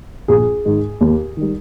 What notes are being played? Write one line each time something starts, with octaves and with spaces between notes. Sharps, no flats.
A#1 G#4
G#2 D#3 G#3
D#2
D#3 G3